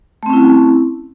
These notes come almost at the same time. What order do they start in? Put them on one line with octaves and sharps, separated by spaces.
A3 C4 C#4 E4